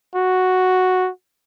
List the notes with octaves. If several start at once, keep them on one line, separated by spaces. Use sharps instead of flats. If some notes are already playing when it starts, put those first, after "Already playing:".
F#4